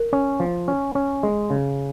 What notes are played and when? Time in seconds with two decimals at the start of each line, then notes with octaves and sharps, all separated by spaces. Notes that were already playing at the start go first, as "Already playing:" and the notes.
Already playing: A#4
0.13 C#4
0.40 F3
0.68 C#4
0.95 C#4
1.23 G#3
1.50 C#3